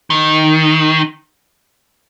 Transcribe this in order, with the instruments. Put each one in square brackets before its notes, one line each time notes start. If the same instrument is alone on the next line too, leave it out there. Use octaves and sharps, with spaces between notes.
[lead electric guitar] D#3